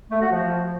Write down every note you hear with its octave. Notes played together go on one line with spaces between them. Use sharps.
A3
F#4
F3